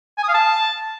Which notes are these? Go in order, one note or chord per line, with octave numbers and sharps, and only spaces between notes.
G#5
D#6
F5
A5